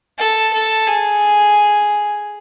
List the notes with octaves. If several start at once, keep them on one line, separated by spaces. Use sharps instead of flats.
A4
A4
G#4